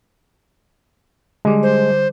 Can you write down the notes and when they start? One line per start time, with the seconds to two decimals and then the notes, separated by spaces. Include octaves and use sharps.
1.45 D3 G3 G#3
1.63 C5